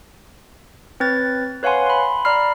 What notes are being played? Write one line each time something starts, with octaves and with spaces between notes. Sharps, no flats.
C4 B4 C#5 G#6 A6
B4 C#5 F5 F#5 G#5 C6
B5 C6
D5 A#5 B5 F6 C7